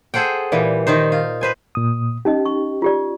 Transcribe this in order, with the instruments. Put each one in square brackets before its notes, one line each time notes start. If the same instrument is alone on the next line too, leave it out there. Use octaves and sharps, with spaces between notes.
[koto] G#4 A4 C5 F#5 G5
A#2 E3 G3
D#3 D#4 C5
F4
B4 C5 G#5
[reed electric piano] A#2 D#6
[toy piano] C#4 D#4 D#5 [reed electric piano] G4
[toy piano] C#6
F4 G4 D5